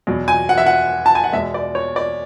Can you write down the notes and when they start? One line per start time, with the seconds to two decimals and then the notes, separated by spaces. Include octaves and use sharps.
0.07 E2 B2 F#3
0.28 G#5
0.49 F#5
0.58 E5
0.66 F#5
1.06 A5
1.15 G#5
1.24 F#5
1.33 E2 B2 G#3 E5
1.54 D5
1.75 C#5
1.96 D5